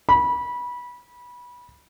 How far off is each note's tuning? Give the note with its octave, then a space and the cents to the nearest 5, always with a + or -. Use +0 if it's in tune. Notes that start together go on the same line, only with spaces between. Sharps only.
B5 -20